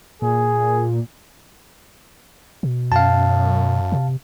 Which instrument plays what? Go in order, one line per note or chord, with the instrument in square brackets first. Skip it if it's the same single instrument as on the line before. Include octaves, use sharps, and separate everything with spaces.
[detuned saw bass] A#2 [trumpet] G#4
[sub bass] B2
[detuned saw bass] F#2 [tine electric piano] F5 A5
[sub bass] C3